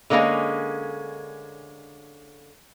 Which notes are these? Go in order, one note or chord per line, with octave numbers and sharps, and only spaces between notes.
D3 G#3 A#3 C4 C#4